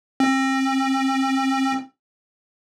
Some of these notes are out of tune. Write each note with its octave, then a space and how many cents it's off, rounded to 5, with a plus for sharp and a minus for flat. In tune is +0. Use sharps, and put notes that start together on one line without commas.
C4 +35